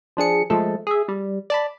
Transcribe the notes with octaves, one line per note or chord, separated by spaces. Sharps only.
F3 D4 G#4 C#7
F3 G#3 A3 A4
G#4 E5
G3
D5 A5 B5